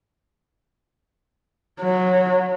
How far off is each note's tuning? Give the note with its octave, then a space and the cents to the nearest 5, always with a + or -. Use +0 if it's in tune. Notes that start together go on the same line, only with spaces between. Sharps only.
F#3 -15